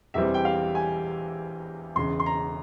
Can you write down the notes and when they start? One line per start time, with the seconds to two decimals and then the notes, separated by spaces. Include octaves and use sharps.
0.14 E1 E2 E3 G3 C4 E5
0.34 G5
0.45 F5
0.75 G#5
1.95 E1 E2 C#3 C6
2.20 C6
2.26 A#5